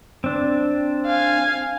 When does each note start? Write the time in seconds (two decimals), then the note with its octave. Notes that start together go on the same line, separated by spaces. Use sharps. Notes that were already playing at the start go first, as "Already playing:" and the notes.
0.24 C4 D4
1.06 F5 G#5